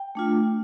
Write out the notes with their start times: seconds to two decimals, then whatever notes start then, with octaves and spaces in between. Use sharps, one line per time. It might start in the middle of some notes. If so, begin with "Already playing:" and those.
Already playing: G5
0.15 A3 D4 F4